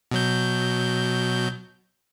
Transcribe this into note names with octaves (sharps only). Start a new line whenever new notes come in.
B2 F#3 G6